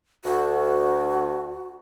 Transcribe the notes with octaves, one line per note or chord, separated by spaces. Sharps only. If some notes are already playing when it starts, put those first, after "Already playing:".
D2 F#4